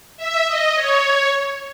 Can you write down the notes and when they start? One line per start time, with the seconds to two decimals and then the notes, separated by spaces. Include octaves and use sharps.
0.17 E5
0.46 D#5
0.75 C#5